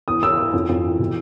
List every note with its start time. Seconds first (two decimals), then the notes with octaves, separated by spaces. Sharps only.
0.08 E2 D#6
0.22 E2 E6
0.38 E3 E6
0.53 F2
0.69 F2
0.84 E3
0.99 B2